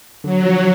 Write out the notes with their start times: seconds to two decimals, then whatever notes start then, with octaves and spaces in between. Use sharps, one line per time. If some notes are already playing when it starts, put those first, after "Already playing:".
0.23 D3 F#3
0.44 F3